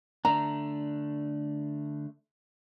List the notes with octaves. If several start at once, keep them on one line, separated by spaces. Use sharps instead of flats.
D3 A3 D4 A#5